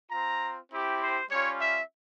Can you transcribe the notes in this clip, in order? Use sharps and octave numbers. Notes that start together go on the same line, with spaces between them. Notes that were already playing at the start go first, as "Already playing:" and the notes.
C4 F4 A#5
C4 E4 G4
C5
G3 C#4 F4 C#5
E5